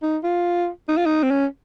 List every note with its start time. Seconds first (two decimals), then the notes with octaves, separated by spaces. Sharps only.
0.02 D#4
0.24 F4
0.89 D#4
0.97 F4
1.06 D#4
1.23 C4
1.31 C#4